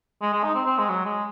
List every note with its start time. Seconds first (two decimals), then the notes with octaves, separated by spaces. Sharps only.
0.22 G#3
0.33 G#3
0.43 D#4
0.55 C4
0.66 C4
0.78 G#3
0.89 F#3
1.05 G#3